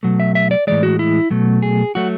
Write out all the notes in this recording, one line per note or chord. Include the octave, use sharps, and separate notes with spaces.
B2 F#3 A3
E5
E5
D5
A2 E3 G#3 D5
F#4
E4
B2 F#3 A3
G#4
F#3 A3 F#4